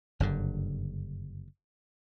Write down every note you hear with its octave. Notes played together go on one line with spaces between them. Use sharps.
F#1 G2 D3